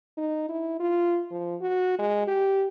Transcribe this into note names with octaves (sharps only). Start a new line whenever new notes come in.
D#4
E4
F4
F3
F#4
G#3
G4